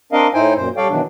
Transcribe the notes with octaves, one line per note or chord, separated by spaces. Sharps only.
C4 D4 A#4 D#5 F5
A2 D#4 E4 C5 G5 G#5
F#2 A#2 C5
G3 A4 C#5 D5 F5 G5
B2 D#3 E3 F#3 D4